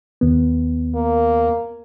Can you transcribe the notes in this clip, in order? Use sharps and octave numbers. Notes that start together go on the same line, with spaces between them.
D#2 B3
A#3